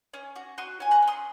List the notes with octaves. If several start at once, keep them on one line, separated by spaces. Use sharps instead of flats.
C#4
F#4
F#4 C6 D#6
C#4 G#5
F#5 A#5
C#4
C6 D#6